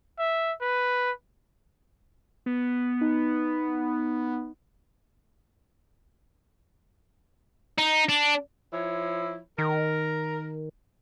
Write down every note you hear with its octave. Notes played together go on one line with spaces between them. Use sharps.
E5
B4
B3
D#4
D#4
D4
F3 E4 C#5
D#3 A#4